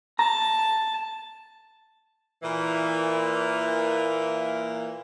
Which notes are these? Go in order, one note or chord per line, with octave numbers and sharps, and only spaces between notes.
A5 A#5
A#2 E3 A#3